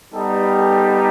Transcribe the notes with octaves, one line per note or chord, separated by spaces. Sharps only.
G3 B3 D#4 G4 A4
A4